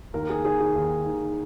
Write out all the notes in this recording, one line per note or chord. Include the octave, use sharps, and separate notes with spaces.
D#2 A#4
G#4
D#3 G#4
G#4
D#2
D#3